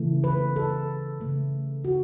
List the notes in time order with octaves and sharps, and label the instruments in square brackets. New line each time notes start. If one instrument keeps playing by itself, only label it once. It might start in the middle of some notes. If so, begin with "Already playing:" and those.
Already playing: [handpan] C#3 E3 A3
B4
A4
C#3 A3
F#4